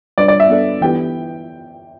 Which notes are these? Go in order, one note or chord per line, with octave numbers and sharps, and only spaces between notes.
G3 D4 B4 D5
D5
E5
B3 D4 A4 D5
E3 B3 E4 G4 B4 G5